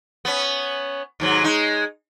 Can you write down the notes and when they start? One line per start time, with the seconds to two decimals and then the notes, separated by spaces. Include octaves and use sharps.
0.25 B3 C#4
1.20 D#2 G#2 F#3
1.44 G#3 D#4